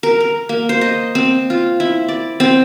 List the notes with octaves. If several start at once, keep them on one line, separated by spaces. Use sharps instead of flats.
A#4
A#4
A#3
C5
D#5
C4
F4
E4
D5
C4